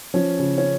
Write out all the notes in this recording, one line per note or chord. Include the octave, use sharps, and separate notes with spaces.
F3 C#4
C#3
C#4